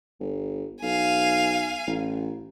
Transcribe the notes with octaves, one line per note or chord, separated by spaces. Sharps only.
G1
B1 F5 G#5
A1